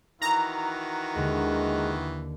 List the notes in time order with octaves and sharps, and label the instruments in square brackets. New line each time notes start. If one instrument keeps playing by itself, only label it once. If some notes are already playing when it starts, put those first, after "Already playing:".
[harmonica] D#3 E3 F#4 [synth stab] A#5
[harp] D#2 D3 [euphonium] G#3